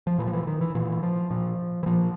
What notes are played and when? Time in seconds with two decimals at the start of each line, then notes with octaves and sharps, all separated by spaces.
0.07 F3
0.18 A#2 E3
0.27 F3
0.33 E3
0.47 D#3
0.61 E3
0.75 A#2 E3
1.03 F3
1.31 A#2 F3
1.83 E3
1.86 A#2 F3